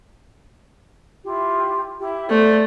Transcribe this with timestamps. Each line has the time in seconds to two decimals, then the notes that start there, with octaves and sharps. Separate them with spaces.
1.24 E4 F4 G4
2.00 E4 G4
2.30 A3 C5 D5